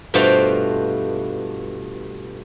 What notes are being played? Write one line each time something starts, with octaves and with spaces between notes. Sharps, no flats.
G2 B2 A3 F4 C5 F5